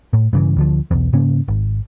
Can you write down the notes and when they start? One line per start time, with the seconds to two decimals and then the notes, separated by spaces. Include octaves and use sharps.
0.13 A2
0.33 G2 C#3 E3
0.56 D2 D3 F3
0.91 B1 E2
1.13 G#2 C#3 A#3 C#4
1.48 G#1